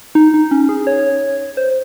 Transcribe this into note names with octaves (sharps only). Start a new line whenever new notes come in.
D#4
D#4
C#4
G#4
C#5
C5